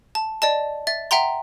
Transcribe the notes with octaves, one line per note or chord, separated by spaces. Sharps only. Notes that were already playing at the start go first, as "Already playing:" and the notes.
A5
D5 D#5 A5
E5 A6
E5 F#5 G5 A#5 C6